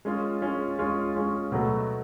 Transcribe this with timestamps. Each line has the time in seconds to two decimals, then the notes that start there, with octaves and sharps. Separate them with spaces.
0.05 G#3 C#4 F4
0.41 G#3 C#4 F4
0.79 G#3 C#4 F4
1.14 G#3 C#4 F4
1.52 B2 F#3 A3